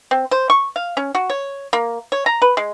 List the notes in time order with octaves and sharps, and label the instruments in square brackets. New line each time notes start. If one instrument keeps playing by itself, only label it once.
[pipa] C4
C5
C#6
F5
C#4
F#4
C#5
A#3
C#5
A#5
B4
G#3